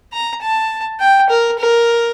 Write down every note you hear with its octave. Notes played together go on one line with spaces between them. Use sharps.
A#5
A5
G5
A#4
A#4